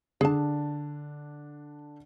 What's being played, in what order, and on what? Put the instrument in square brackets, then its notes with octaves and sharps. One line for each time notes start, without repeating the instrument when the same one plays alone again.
[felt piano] D3 D4 [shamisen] G#4 A5